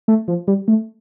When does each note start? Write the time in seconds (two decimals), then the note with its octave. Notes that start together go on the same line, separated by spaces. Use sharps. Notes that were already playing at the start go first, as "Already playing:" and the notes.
0.08 A3
0.28 F3
0.48 G3
0.68 A3